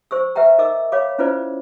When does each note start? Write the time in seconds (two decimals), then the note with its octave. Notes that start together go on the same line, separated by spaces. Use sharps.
0.11 C5 C#6 E6
0.36 B4 E5 F#5 G5 A#5
0.59 A#4 D#5 D6 E6
0.92 C#5 F5 B5 D6
1.19 C#4 E4 F4 B4 C5 D5